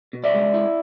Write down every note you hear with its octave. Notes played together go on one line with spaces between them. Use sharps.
B2
D5 E5
G#3
E4